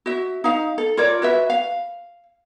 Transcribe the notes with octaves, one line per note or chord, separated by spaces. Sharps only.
F#4 E5
D#4 F5
A4
F4 A#4 C#5 D5
F#4 B4 E5
F5